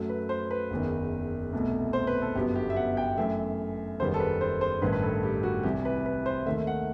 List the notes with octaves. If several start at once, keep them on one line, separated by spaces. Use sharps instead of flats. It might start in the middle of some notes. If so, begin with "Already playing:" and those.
Already playing: F#2 F#3 A3
B4
C5
B4
F#1 E2 D#3
C2 B2 A3
C5
B4
A4
G1 F#2 F#3 B3 G4
G4
E5
F#5
G5
F#2 E3 A3 E5
F#1 E2 D#3 G3 B3 C5
A4
B4
C5
C5
A1 G2 D#3 B4
B4
A4
G4
F#4
C2 C3 E3 G3 G4
B4
B4
C5
D#2 D#3 A3 E5
F#5